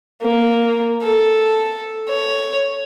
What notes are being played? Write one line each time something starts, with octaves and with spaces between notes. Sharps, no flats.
A#3
A4
C#5